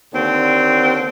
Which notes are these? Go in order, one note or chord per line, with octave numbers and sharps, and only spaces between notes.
D#2 D3 C4